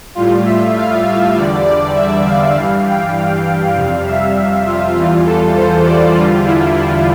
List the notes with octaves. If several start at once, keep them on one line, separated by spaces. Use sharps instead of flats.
A2 G3 F4
E5
F5
E5
E2 D3 G3 D5
D5
E5
F5
G2 E3 G3 F5
G5
F5
F2 C3 G3 F5
E5
E5
F4
E2 E3 G3 F4
A4
C5
D5
E2 D3 G3 F4
E4
E4